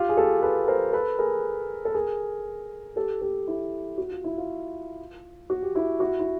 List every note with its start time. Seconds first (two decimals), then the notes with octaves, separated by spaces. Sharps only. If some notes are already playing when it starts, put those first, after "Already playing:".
Already playing: F4 G4
0.09 G#4
0.17 G4 A4
0.42 A4 B4
0.68 A#4 C5
0.93 A4 B4
1.19 G#4 A#4
1.85 A4
1.94 G#4 A#4
2.96 G4 A4
3.22 G4 A4
3.48 E4
3.98 F#4
4.11 F4
4.24 E4
4.38 F4
5.50 F#4
5.62 G4
5.75 E4 F#4
6.00 E4 F#4
6.20 E4